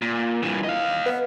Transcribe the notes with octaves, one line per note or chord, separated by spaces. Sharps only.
A#2
G2 E3
D#5 F5
B3